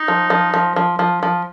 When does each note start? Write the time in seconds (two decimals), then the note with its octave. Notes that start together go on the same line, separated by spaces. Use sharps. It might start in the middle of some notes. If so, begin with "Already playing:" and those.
Already playing: D#4
0.08 F3
0.30 F3
0.54 F3
0.76 F3
0.99 F3
1.23 F3